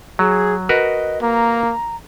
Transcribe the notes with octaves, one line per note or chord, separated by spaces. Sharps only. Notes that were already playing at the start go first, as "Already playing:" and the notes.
F#3 G#4
F#4 A#4 B4 D#5
A#3 A#5